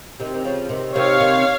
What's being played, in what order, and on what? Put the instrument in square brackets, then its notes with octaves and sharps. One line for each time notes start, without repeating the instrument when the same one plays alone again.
[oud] C3 D#3
D#3
C#3 F3
C3 D#3
[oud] C3 D#3 [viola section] C#5 F5
[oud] C3 D#3